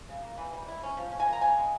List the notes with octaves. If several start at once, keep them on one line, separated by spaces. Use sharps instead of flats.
C#3
A#3
E3
G3
E4
C#4
F3
C#4
G#5
A#3
A#5
C#3 G#5
G#3